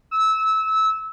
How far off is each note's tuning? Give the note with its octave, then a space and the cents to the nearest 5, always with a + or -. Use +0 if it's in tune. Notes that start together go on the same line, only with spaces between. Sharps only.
E6 -20